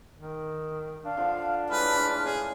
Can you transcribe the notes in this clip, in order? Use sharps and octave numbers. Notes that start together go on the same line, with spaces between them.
D#3
D4 F5
D3 F3 D4
A2 G#3 B4 F6
C#4 G#4 D5